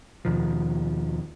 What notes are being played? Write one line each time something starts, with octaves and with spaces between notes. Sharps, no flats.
D#2 B2 D#3 F3